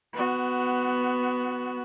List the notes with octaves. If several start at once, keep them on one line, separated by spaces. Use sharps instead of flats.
B3 F#4